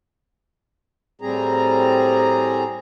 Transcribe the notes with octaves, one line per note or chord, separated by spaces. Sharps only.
A2 G3 C4 G#4 A#5